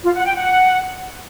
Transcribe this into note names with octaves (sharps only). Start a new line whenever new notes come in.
F4
F#5
G5
F#5